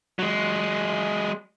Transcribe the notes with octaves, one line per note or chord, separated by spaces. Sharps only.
F#3 G#3